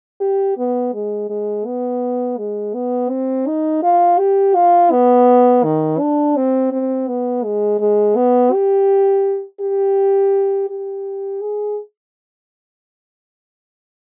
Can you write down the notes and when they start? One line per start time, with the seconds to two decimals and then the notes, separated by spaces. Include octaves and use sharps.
0.21 G4
0.58 B3
0.93 G#3
1.30 G#3
1.66 B3
2.38 G#3
2.74 B3
3.10 C4
3.47 D#4
3.83 F4
4.18 G4
4.55 F4
4.91 B3
5.64 D#3
5.99 D4
6.36 C4
6.72 C4
7.08 B3
7.44 G#3
7.80 G#3
8.16 B3
8.52 G4
9.61 G4
10.70 G4
11.41 G#4